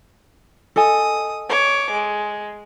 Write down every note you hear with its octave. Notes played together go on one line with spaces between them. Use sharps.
A4 D#5 G#5 D#6
C#5 D6
G#3